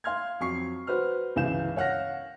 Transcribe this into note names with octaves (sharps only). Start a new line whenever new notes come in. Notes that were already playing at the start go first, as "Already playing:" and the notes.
F5 C6 F6 G#6
F2 F#3 C#6 C7
F#4 B4 C5 F6
G1 C#2 E3 F5 G6 E7
C#5 F5 F#5 F6 A#6